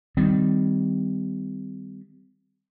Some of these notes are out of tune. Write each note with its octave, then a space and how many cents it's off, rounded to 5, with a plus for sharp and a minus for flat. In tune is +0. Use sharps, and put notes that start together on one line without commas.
D#3 +0 G3 +0 C4 -30